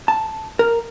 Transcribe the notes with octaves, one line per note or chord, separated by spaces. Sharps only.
A5
A#4